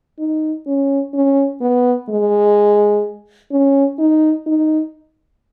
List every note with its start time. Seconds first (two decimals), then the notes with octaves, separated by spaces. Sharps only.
0.19 D#4
0.67 C#4
1.14 C#4
1.61 B3
2.09 G#3
3.51 C#4
3.99 D#4
4.46 D#4